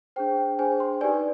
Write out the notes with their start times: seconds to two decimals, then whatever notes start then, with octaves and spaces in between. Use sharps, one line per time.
0.16 D4 G#4 C5 G5
0.59 D4 G#4 C5 G#5
0.80 C6
1.01 D#4 G4 B4 D5 G#5